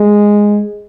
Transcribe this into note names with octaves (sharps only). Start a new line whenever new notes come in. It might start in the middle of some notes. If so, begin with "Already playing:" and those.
Already playing: G#3